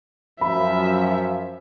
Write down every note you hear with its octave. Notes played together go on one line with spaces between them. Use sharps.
F#2 F3 E5 B5